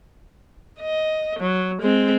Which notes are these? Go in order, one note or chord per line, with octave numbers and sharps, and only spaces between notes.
D#5
F#3
G#3 C4